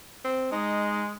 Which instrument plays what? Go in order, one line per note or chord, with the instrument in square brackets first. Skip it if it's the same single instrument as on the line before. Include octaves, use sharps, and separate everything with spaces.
[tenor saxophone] C4
[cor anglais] G#3 [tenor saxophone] D#4